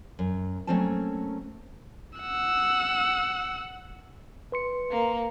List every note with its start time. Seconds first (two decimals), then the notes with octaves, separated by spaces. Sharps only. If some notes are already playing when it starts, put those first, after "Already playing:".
0.19 F#2
0.67 F#3 A3 A#3 C4 C#4 A5
2.19 F#5 E6
4.52 B4 C6 C#7
4.91 A#3